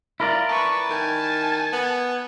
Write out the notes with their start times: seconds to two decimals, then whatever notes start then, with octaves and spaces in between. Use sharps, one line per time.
0.20 E4 F4 A#4 D5
0.49 B4 A5 C#6
0.90 D#3 G#5
1.73 B3